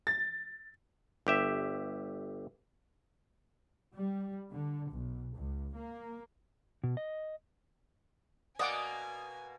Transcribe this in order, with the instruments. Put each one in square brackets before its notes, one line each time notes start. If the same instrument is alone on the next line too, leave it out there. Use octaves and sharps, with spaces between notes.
[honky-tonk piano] A6
[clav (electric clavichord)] G1 G4 E5
[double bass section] G3
D3
B1
C#2
A#3
[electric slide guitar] B2
D#5
[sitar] B2 A#3 [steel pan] D5 F#5 D6 [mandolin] D#5 [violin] G#5